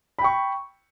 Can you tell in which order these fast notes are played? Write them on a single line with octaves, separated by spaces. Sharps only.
B5 G5 C#6